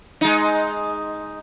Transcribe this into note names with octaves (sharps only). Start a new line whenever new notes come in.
G#3 D#4